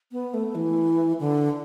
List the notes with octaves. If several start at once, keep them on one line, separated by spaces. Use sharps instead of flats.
B3
A3
E3
D3